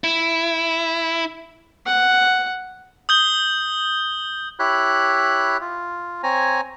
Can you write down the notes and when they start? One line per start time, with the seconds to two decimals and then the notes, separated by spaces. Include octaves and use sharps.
0.04 E4
1.86 F#5
3.09 D#6 G6 G7
4.59 E4 G4 C#5 B5 F#6
5.61 F4
6.23 C4 C#5 G#5 A#5